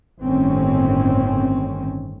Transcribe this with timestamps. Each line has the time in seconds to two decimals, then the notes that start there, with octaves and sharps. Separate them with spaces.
0.20 G1 A2 D#3 C4 C#4